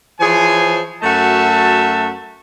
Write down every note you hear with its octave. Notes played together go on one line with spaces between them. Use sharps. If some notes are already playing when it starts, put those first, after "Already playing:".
E3 F3 G#4 C5 C#5 G#5
F#2 A3 F#4 E5 A5